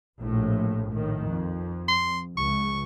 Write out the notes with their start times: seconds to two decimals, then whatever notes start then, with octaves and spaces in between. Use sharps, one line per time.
0.20 A#1 A2
0.92 A2 D#3
1.30 F2
1.88 C6
2.37 C#2 C#6